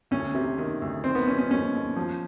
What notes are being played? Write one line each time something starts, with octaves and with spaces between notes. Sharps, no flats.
D2 C#4
C3
D#3
D2
D#3 C4
B3
D#3 C#4
C#4
D#2 C#4
D#2
F3